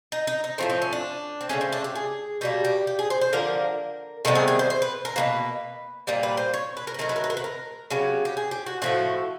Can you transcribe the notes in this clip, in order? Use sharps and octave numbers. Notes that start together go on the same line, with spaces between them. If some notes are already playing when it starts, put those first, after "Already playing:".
D#4
D#4
D#4
A2 F3 A3 C4
C4
C#4
D4
C4
C#3 F3 A3 C#4
C4
D4
G4
G#4
B2 G3 A#3 G4
G4
G4
G#4
C5
C5
D3 F3 A#3 A#4
C3 D#3 G3 B3 A4
G#4
G#4
C5
C5
B4
A#4
B2 G3 A#3 B4
A#2 G3 A#3
B4
C5
C#5
B4
A#4
B4
D#3 F#3 A3 A#4
B4
A#4
B4
A#4
B4
A#4
C#3 F#3 B3 G4
G4
G#4
G4
F#4
A2 F3 A3 F#4